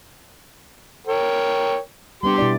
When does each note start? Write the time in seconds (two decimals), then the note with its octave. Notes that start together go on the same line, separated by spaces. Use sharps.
1.07 A#4 C#5 G5
2.23 G3 B3 D4 G4 C6
2.38 B2 E4 D5